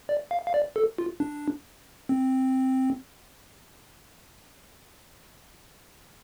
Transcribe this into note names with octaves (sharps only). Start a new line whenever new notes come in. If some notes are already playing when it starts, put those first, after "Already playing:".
D5
F5
F5
D5
A4
F4
D4
C4